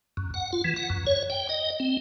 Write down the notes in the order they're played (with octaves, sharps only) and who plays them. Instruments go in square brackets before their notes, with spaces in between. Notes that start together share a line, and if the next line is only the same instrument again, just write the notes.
[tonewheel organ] F#2
F#5
F4
E3
F#5
F#2
C#5
G5
D#5
C4